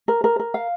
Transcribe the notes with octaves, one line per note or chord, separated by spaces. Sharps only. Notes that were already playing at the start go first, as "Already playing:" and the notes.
A#4
A#4
A#4
F5